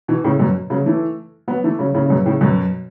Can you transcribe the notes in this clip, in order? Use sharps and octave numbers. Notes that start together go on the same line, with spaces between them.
B2 E3
A2 C#3
F#2 B2
C#3 F#3
E3 A3
F#3 B3
E3 A3
C#3 F#3
A2 C#3
C#3
F#2 B2
A2 C#3
F#2 B2